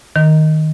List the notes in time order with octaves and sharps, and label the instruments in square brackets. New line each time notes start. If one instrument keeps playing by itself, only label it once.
[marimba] D#3